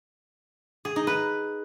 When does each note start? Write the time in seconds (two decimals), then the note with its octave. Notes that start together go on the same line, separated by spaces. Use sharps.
0.85 G#4
0.96 D#4
1.07 B4